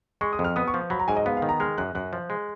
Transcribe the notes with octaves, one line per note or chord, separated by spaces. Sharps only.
G#3 C#6
D#6
F2
F6
B3 D#6
C#6
F3
F#3 B5
A#5
G#2 G#5
D#5
B3 F5
F5
D#3
A#5
G#3 F6
F#2 F#6
F#2 F#6
F3
G#3